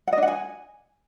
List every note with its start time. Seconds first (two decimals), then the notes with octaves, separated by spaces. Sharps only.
0.07 F#5
0.13 D#5
0.18 D4
0.23 F#5
0.28 G#5